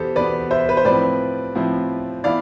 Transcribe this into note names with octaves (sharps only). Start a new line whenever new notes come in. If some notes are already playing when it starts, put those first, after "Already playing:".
Already playing: E2 B2 B3 G4 A4 C5
E2 B2 B3 B4 D5
C5 E5
B4
C5
A2 F3 C4 E4 B4 D5
A2 F3 C4 E4
E3 B3 E4 D5 F5